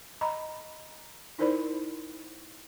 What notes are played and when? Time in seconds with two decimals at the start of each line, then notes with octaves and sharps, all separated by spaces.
0.21 D#5 A#5 B5
1.39 D#4 E4 A#4 C5 D5 B5